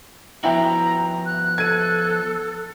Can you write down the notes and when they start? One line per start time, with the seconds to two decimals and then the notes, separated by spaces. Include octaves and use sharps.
0.44 F3 B3 E4 F#4 G5 A#5
1.26 F#6
1.58 A4 G#6 D#7